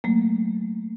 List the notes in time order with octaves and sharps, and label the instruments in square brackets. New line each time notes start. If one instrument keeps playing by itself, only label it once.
[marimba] F#3 A3 A#3